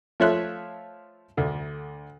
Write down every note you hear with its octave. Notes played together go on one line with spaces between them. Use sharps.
F3 A3 C#5 E5 C6 F#6
D2 D3